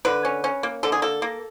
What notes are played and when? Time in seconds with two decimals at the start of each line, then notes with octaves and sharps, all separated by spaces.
0.05 D3 B4
0.25 C#4
0.44 C#4
0.63 A#3
0.83 D3 A4
0.92 G#4
1.02 A#3 A4
1.22 A#3